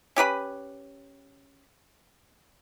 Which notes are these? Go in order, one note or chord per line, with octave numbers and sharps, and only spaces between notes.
C#4 G4 B4 B5